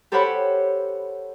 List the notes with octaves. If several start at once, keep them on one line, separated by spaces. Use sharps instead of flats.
G4 A4 C5 C#5 F#5 B5